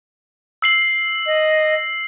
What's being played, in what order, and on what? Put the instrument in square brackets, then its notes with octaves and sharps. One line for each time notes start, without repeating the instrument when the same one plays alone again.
[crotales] E6 C7 F#7
[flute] D#5